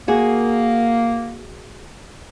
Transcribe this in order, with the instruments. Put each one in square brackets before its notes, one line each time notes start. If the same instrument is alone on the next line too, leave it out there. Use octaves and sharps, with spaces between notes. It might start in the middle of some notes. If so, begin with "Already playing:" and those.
[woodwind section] A#3 [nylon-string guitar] F#4 G#4